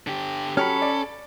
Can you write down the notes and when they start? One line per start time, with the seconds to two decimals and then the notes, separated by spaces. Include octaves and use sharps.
0.07 D3 G4
0.57 F#3 C#4 G4 A4 C#5 B5 F6
0.82 D5